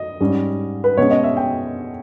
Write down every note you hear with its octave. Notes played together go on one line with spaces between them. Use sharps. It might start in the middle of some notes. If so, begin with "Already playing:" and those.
Already playing: D#5
G#2 G3 C#4
B4
B2 G#3 C#4 C#5
D#5
E5
G5